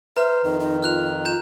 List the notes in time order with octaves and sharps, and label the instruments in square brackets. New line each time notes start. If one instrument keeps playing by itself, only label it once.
[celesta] B4 [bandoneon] C5 [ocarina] E5 [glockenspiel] A#5 F6
[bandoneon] F2 D#3 [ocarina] D#4
[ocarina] D#4
[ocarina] F4 [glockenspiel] F6 F#6 F7
[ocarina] F4 [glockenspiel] A#5 G6 E7